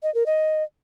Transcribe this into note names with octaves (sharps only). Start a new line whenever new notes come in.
D#5
A#4
D#5